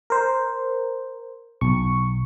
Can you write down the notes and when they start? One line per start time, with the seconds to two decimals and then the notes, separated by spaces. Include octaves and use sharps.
0.10 A#4 C5
1.61 B1 C#6